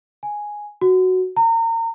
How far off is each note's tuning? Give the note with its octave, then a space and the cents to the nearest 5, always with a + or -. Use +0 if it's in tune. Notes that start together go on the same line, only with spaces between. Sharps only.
G#5 +0
F#4 +0
A#5 -35